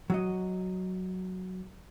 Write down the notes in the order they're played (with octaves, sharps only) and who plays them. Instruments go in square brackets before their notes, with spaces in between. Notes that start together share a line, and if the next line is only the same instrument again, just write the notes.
[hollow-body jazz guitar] F#3 F#4 D#5